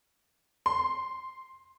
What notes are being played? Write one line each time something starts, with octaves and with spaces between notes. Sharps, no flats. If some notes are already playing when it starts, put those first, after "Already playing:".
C6